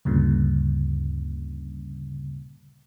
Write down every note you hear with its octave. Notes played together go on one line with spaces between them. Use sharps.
D2 G2 A#2 C#3